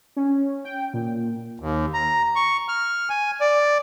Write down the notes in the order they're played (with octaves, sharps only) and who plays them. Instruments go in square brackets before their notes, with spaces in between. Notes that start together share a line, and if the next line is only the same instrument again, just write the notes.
[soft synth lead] C#4
G5
A#2
[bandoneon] D#2
A#5
C#6
F6
G#5
D5